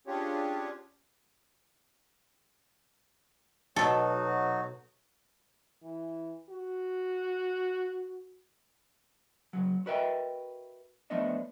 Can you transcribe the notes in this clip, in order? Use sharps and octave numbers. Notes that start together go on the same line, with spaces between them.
C#4 D4 F4 G4 G#4 C#5
B2 F#3 D#4 F#4 A4
E3
F#4
C#3 F#3
F#4 A#4 B4 D#5 E5 G5
F3 A3 B3 D4 D#5 E5